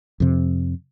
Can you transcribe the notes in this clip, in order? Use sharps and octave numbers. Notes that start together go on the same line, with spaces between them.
F2 C3